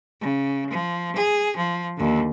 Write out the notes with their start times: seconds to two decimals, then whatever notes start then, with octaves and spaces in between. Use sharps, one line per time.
0.21 C#3
0.71 F3
1.16 G#4
1.57 F3
1.97 D#2 D3